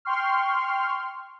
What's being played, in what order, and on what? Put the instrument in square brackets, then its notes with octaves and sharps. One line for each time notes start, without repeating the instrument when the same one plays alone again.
[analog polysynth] G5 C6 C#6 F6